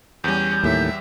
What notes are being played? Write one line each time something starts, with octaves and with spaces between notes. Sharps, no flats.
E2 G3 C#4 G6
D#2 A2 E5